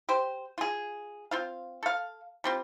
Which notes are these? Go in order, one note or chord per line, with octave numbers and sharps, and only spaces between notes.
G4 C5
F4 G#4
C4 F4 F5
A4 F5
G3 C4 F4